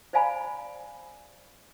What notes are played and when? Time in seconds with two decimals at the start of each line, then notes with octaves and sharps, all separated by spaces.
0.13 C5 D5 F5 G#5 A#5 B5